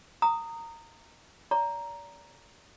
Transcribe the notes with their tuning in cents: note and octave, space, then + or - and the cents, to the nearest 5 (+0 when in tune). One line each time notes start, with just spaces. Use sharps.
A#5 -20 D#6 +0
D5 -35 A#5 +0